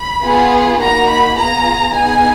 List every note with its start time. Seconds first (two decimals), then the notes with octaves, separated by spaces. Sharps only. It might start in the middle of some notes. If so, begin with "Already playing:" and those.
Already playing: B5
0.24 B3 F4 G#4
0.79 A#3 D#4 F#4 A#5
1.08 B5
1.36 B3 F4 G#4 A#5
1.92 B3 D#4 G#4 G#5